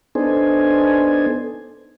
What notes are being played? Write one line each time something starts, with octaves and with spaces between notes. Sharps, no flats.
B3 D4 D#4 A4 C5 G#5